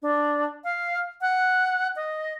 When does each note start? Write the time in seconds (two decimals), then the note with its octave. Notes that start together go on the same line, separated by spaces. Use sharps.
0.02 D4
0.64 F5
1.21 F#5
1.96 D#5